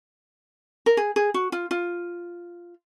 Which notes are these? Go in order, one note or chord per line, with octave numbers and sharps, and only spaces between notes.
A#4
G#4
G#4
F#4
F4
F4